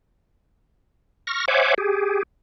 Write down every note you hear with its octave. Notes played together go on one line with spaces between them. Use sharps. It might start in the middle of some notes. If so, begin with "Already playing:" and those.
C#6 F6 A#6
C5 C#5 E5 F#5 G#5 D6
G4 G#4